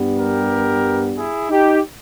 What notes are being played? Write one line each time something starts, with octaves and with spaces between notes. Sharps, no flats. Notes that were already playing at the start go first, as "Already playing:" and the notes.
Already playing: G2 G3 B3
G4 A#4
E4 G#4
D#4 G4